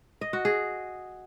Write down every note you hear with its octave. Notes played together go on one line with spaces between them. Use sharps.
D#5
F#4
G#4